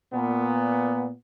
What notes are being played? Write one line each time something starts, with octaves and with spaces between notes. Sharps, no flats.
A#2 B3